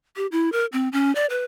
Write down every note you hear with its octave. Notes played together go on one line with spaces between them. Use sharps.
G4
E4
A#4
C4
C#4
D5
B4